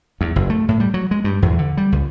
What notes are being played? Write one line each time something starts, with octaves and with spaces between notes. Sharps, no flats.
E2
F#1
A3
A2
G3
F#3
G#3
G2
E2
D3
G3
C#2